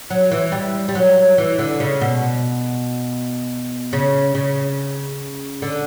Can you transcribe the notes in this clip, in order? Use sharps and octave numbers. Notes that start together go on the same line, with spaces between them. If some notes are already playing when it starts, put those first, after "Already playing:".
F#3
E3
G3
G3
F#3
E3
D3
C#3
B2
C#3
C#3
D3